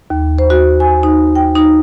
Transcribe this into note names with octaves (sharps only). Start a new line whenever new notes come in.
D#2
C5
F#4
G#5
D#4
G5
D#4